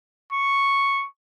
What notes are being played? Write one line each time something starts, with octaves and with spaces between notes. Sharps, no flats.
C#6